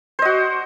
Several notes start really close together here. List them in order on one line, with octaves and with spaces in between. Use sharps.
C5 D#5 F#4